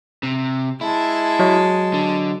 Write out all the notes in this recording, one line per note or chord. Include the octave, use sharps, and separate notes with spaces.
C3
G#3 E4 A5
F#3 C#5 D#5
D3